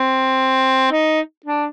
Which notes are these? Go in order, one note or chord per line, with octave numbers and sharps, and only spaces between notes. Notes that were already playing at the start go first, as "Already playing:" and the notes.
Already playing: C4
D#4
D4